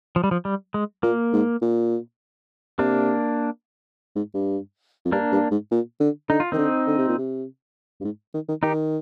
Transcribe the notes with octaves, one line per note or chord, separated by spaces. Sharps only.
F3
G3
F3
G3
G#3
A#2 A#3
G#2
A#2
C3 A#3 D4
G#2
G2
F2
G2 A#3 D4
G2
G#2
A#2
D3
D3 D#4
F4
D#3 C4 D#4
D3
D3
C3
A#2
C3
G2
G#2
D#3
D#3
D#3 D#4 G4